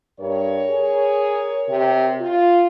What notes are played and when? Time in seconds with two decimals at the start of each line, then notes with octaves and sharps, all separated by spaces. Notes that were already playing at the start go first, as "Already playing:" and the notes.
0.20 G2 A#4 C#5
0.70 G#4
1.69 C3
2.20 F4